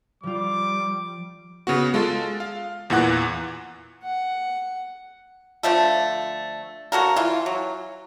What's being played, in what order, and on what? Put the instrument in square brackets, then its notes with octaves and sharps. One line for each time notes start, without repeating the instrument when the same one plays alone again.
[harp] F3 F4 [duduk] G3 [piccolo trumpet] D6
[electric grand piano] C#3 B3 F#4
G#3 F4 A4
F5
E2 A#2 E3 F#5 F#6
[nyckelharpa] F#5
[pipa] D3 F3 A3 A4
C#3 F#4 A4 A#4
E3 F4
F#3